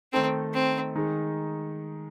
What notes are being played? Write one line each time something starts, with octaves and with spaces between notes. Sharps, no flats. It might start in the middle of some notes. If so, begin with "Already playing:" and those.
D#3 A3 C4 D#4 A4
C4
D#3 G#3 D#4